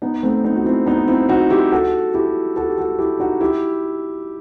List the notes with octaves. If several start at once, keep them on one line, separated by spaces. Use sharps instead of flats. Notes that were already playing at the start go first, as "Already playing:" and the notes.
B3 D#4
A3 C4
B3 D#4
F#4
C4 E4
B3 D#4
C4 E4
D#4 F#4
E4 G4
F#4 A4
E4 G4
F#4 A4
G4
F#4 A4
E4 G4
D#4 F#4
E4 G4